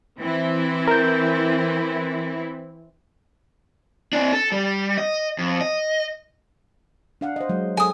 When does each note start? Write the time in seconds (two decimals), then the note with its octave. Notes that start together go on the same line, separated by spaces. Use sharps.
0.19 E3 C4 E4
0.88 A#4 G6
4.13 C4 D4
4.33 A4
4.52 G3
4.98 D#5
5.38 F2
5.61 D#5
7.21 D4 F5 F#5
7.36 C5 D#5
7.49 F#3 G#3
7.77 F#3 G#4 A4 G#5 D#6